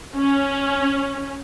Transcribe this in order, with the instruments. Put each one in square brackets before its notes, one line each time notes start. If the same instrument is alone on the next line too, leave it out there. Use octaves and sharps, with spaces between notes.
[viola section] C#4